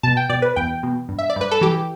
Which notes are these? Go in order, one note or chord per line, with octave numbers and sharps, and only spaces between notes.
B2 A5
G5
B2 D5
B4
E2 G5
B2
G2
E5
D5
G2 B4
A4
E3 G4